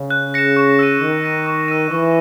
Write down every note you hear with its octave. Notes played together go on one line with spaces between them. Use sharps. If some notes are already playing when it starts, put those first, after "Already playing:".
Already playing: C#3
F#6
A#6 C#7 E7
C#6
E6 A#6 D#7
D#3 C#6
E6 A#6 D#7
C#6
E6 A#6 D#7
E3 C#6